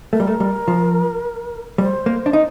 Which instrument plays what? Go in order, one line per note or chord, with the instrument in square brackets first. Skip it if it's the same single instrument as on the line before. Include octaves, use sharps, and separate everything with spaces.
[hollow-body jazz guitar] A3 [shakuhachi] A#4
[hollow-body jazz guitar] G3
A3
G3
F3
[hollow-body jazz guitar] G3 [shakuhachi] C5
[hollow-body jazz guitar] A#3
D4
D#4